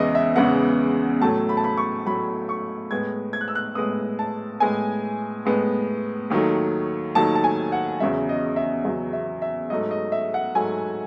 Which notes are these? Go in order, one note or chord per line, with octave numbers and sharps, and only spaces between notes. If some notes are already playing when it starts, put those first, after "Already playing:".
Already playing: E2 C#3 E3 G#3 B3 D#5 E5
E5
E2 C#3 E3 G#3 B3 F#5
A2 F#3 A3 A5
B5
A5
B5
C#6
A2 F#3 A3 B5
C#6
A2 G#3 B3 G#6
G#6
F#6
E6
F#6
A2 G#3 B3 D#6
A5
A2 G#3 B3 G#5
A2 G#3 B3
D#2 D#3 F#3 A3
D#2 D#3 F#3 A3 A5
A5
G#5
F#5
E2 C#3 F#3 E5
D#5
E5
E2 C#3 F#3
E5
E5
G#2 F#3 A3 D#5
D#5
E5
F#5
G#2 F#3 A3 G#5